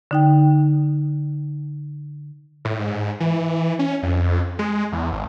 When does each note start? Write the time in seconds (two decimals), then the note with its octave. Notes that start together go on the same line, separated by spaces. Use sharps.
0.11 D3 D#4 G5
2.65 A2
2.79 G#2
3.20 E3
3.79 C#4
4.03 F2
4.59 G#3
4.92 E2
5.12 G#1